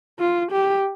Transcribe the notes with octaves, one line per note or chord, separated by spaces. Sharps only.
F4
G4